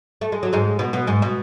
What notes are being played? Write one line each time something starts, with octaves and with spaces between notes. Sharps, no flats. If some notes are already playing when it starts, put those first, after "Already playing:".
A3
G#3
F#3
G#2 G#3
B2 B3
B2 B3
G#2 G#3
B2